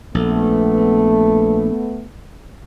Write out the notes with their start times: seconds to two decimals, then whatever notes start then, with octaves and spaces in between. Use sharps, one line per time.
0.15 A#1 A3 B3